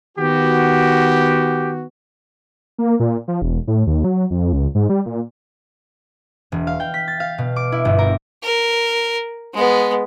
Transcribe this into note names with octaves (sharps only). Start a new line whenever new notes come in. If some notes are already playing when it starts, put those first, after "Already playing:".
D#3 B3 F#4 G4
A#3
A#2
F3
E1
A2
D#2
F#3
F2
C#2
G#2
G3
A#2
E1
F5
G5
B6
A6
F5
B2
D6
E4
G1
A#4
A#4
G#3 B3